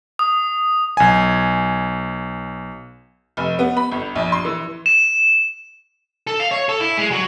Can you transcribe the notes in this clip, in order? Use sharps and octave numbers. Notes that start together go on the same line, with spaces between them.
D#6
B1 G#5
F1
B3
B5
G1
A#1
C6
E3
E7
A4
F5
C#5
A4
E4
G#3
F#3